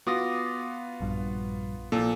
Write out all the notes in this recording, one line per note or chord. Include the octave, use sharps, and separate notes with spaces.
B3 F4 F#4 D6 D#6 A#6
A#1 G2
A#2 F3 A#3 A4